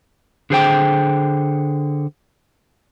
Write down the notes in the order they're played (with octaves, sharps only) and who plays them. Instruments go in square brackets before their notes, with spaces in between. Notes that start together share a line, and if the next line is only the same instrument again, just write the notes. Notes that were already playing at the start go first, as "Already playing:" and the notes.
[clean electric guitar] D3 G#4 C5 G5